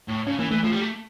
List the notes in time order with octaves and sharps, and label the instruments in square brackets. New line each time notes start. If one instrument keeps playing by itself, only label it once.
[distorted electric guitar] A2
[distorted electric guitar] C#3 [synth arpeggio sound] C#4
[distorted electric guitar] E3 [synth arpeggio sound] A#3
[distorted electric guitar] E3 [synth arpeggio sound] A3
[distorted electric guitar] F3 [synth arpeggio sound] A3
[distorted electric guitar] G3
A3